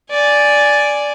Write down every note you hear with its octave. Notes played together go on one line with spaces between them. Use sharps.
D5 G#5